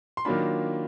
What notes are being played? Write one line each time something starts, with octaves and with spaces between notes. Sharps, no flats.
C6
D#3 F#3 A#3 D4 F4 B5